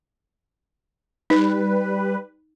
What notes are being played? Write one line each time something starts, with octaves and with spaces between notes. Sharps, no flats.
G3 D#4 B4